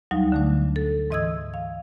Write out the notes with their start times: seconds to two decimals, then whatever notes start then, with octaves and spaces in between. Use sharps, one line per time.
0.11 D2 F#3 G3 D#4 F5
0.32 D3 A3 D4
0.76 A4
1.10 G#2 E3 D#5 D#6 E6 G#6
1.54 F5